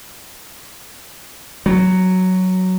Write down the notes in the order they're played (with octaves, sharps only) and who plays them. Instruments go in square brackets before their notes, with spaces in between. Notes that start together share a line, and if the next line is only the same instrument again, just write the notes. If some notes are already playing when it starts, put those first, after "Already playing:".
[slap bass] F#3